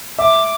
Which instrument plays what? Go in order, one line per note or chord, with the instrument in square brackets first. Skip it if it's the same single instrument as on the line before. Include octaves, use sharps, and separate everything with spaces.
[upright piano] E5 [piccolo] D6